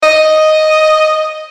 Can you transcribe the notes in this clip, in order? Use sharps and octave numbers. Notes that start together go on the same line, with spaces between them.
D#5